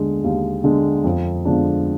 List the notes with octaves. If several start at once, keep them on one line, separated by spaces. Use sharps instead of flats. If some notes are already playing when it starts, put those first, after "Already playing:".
Already playing: D#2 D3 G#3
D#2
D3 G#3
F2
D3 F3 G#3 D4